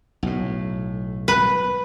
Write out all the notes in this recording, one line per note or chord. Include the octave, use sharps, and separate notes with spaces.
B1 A2
B4